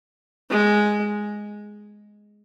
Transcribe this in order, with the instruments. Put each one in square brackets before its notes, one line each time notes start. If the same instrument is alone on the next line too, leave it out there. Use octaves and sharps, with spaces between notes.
[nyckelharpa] G#3